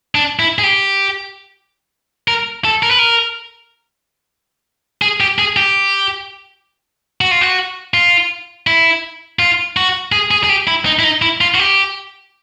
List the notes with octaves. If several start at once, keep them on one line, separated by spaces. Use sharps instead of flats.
D4
E4
G#4
G4
A#4
A4
A#4
B4
A#4
G#4
G4
G#4
G4
F#4
F4
F#4
F4
E4
F4
F#4
G#4
G#4
G#4
G4
E4
D#4
E4
D#4
E4
F4
F#4
G4